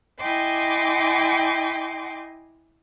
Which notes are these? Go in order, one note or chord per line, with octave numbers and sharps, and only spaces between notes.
E4 D#5 G5 G#5 C6 D6